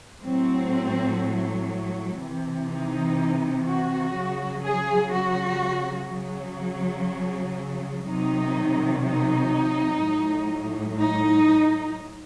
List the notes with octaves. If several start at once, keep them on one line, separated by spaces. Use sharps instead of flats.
A2 F#3 C4
C3 E3
D#4
F#4
C#3 F#3
G#4
F#4
C#3 F#3
C3 D#3 F#3 D#4
D#4
A2 F#3
D#4